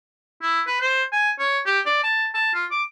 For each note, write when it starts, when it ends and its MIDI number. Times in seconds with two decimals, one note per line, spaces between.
0.42 0.62 64
0.67 0.81 71
0.81 1.04 72
1.12 1.31 80
1.39 1.59 73
1.66 1.80 67
1.86 2.00 74
2.04 2.27 81
2.34 2.52 81
2.54 2.66 65
2.71 2.83 86